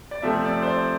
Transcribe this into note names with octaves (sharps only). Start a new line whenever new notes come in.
D5
C3 F3 A3 C4 E5
D5
C5
D5